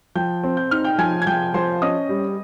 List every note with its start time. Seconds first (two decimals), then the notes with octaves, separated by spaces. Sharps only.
0.15 F3 G5 G6
0.44 C4
0.57 G6
0.71 D#4 F6
0.85 G5 G6
0.98 F3 G#5 G#6
1.22 G#6
1.27 F3 G5 G6
1.54 F3 C5 C6
1.82 C#4 D#5 D#6
2.09 G3